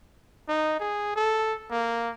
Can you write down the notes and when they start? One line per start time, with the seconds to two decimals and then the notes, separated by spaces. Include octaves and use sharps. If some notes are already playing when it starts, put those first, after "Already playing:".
0.49 D#4
0.80 G#4
1.16 A4
1.71 A#3